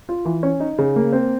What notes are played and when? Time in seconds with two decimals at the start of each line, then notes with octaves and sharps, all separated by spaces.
0.09 F4
0.25 E3
0.43 C#4
0.60 D#4
0.78 C#3
0.96 A#3
1.13 C4